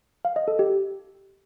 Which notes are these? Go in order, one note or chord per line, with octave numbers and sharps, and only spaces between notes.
F5
D#5
A4
G4